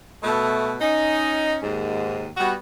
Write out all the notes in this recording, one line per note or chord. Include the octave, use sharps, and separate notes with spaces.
B2 A3
C#4 D#4
D#2 G#2
G3 B3 F#4